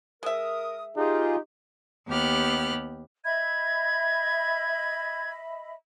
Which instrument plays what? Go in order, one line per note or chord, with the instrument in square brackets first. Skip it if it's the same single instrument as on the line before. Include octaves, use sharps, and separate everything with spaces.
[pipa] G#3 E5 [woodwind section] A#4 D#6
[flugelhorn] D#4 [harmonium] F4 G#4 [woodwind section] G4
[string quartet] D#2 B3 G4 F6 F#6
[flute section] D#5 E5 B5 [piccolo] G#6